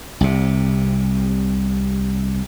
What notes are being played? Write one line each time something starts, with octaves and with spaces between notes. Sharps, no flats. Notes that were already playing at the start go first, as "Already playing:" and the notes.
C2 C3